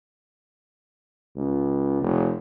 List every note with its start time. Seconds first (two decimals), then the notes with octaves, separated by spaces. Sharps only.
1.37 C#2
2.02 F1